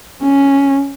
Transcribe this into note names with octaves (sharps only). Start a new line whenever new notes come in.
C#4